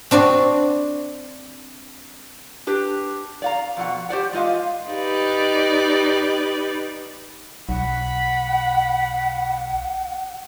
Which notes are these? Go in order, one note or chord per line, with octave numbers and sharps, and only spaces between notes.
C4 D4 F#4 D5
D4 G4 B4
D5 F5 A#5
F2 B2 F#5
G4 C5 D5 F#5
G#3 F4 D#5 F5
D#4 G4 B4 D5
B1 F#5 B5